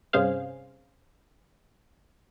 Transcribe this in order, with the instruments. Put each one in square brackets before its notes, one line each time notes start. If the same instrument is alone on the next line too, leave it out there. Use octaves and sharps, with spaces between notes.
[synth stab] G2 C3 C#4 G#4 C5 F5